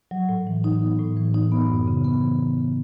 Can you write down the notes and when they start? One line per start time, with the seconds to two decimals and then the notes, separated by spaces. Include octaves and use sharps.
0.11 F#3
0.29 A2
0.47 E3
0.64 D#4
0.82 B3
0.99 A2
1.16 E3
1.34 D#4
1.52 B3
1.70 F#2
1.88 C#3
2.04 B3
2.22 E3
2.40 F#2
2.58 C#3